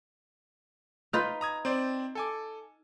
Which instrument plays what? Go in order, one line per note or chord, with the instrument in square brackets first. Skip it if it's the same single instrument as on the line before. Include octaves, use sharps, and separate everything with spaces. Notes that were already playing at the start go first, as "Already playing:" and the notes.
[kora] D#4 F4 B4 [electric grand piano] F6 B6
[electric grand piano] A#5 D#6 G#6
C4 C5 D5
A4 G#5 D6